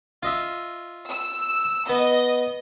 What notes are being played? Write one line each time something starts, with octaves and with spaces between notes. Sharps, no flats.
F4 D#5 E5
E6
B3 D#5